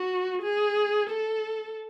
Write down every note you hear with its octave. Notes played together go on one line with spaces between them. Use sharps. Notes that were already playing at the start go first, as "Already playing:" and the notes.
Already playing: F#4
G#4
A4